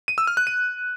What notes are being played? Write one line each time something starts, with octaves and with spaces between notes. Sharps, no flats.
D#7
E6
F6
F#6
D#7